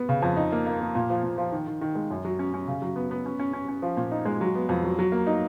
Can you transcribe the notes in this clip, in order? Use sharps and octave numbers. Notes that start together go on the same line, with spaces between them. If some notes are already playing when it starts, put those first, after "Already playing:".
Already playing: B3
C#3
F2
D#4
A#3
A#3
A#3
A#2
F3
A#2
F3
D#3
D#3
D#3
G#3
F#2
F#3
C#4
C#4
C#3
F#3
B3
B3
C#4
C#4
C#4
C#4
F3
A#2
D#4
G#3
F#3
B3
F2
F#3
F#3
A#3
D#4